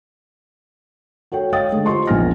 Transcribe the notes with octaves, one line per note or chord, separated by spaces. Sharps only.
F#4 A4 C#5 G5
C#5 D#5 F5 G5 D#6 A6
D3 G#3 A3
F4 G4 C5 D#5 C6 C#6
E1 A#1 B3 G#5 F6 A#6